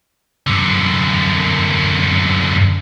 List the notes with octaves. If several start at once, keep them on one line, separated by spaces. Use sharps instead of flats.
F#2 D3